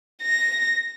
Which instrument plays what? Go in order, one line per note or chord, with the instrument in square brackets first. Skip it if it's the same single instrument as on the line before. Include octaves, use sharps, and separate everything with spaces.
[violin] A#6